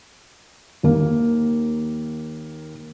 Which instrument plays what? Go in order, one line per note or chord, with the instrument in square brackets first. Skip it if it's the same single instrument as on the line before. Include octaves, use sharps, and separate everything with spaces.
[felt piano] D#2 A#3